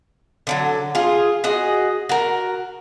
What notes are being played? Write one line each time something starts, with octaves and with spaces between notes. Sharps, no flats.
D3 F3 F#3
F4 G#4
F#4 G#4 D#5
F#4 A#4